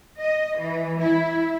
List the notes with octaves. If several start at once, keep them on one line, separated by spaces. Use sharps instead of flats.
D#5
E3
E4